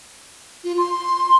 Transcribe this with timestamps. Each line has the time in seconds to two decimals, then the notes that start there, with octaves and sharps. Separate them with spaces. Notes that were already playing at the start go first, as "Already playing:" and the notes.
0.64 F4
0.77 C6